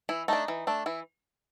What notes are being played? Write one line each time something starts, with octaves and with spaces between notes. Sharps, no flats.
E3 E4
A3 D4 D#4
E3
A3 D4
E3 E4